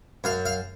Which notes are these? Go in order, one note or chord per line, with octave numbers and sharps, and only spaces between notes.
F#2 F5
F5